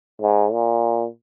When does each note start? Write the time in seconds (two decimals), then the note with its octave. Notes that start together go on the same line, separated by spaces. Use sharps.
0.21 G#2
0.52 A#2